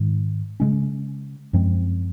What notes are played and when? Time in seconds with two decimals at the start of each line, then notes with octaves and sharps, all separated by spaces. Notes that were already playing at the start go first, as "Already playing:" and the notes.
Already playing: G#2 D#3 G#3
0.60 C#3 G#3 C#4
1.53 F#2 F3 G#3 C4